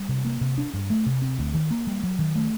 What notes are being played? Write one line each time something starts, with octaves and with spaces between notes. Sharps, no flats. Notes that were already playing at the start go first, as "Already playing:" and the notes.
Already playing: G3
C3
A#3
C3
D4
G2
A3
C3
C4
D2
D#3
A#3
G3
F#3
D#3
A3